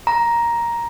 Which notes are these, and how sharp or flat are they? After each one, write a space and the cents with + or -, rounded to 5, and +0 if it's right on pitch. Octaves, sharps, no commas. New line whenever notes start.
A#5 +10